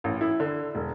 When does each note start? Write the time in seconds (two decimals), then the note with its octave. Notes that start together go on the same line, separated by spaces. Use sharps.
0.04 A1
0.21 E4
0.40 D3
0.75 E1